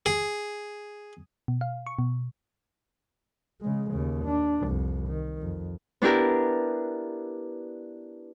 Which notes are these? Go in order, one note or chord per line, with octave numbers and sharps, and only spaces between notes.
G#4
B2
F5
C#6
B2
C#3 G#3
D#2 C#3
D4
C2 F2
D#3
F2
B3 D4 E4 G4 A#4